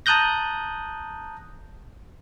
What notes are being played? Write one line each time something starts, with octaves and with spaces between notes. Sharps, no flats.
A5 A#5 D#6 F#6 G6 A#6